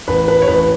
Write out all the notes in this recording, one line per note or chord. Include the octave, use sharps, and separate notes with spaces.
A1 B4
B4
C#5
A1 B4